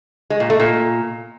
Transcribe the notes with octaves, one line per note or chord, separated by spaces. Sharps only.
G#3
A#2
A3
A#2